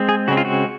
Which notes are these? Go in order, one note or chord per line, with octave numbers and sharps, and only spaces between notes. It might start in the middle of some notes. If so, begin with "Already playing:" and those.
Already playing: G#3 C4
G#4
C#3 G#3 C4 F#4
F4
F#4